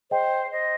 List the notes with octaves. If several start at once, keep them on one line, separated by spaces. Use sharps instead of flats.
G#4 C5 D#5 G5
C5 D#5